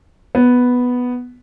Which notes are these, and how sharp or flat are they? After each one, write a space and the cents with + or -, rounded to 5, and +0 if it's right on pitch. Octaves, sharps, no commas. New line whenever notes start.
B3 +0